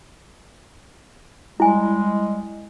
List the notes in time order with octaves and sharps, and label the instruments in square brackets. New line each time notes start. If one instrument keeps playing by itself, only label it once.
[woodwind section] G3 G#3 [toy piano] E4 G#5